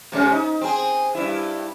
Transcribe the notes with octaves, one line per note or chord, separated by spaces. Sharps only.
C3 G#3 C#4
D#4
C4 G#4
G2 E4